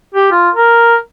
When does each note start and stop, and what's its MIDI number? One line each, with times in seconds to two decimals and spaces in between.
0.15 0.28 67
0.32 0.50 65
0.55 0.96 70